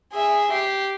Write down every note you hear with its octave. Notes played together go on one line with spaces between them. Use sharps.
G#4 E5
G4 C7